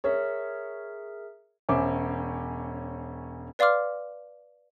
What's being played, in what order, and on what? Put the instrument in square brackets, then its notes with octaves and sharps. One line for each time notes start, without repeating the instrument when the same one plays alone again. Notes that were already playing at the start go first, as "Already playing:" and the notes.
[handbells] G#4 A#4 E5 [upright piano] C#5
[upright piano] E1 C#4 C5 E5 D6
[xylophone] B4 D5 F5 C6 D6 F6